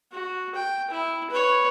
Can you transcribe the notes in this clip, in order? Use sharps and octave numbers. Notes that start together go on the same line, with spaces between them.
F#4
G5
E4
B4 C#5